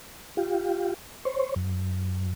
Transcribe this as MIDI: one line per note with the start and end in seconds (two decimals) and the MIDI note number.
0.37 0.94 65
0.37 0.94 67
1.25 1.54 72
1.25 1.54 73
1.56 2.33 42